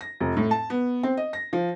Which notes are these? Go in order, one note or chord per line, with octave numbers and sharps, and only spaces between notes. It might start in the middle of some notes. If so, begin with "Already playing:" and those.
A#6
F1
A2
A5
B3
C4
D#5
A#6
F3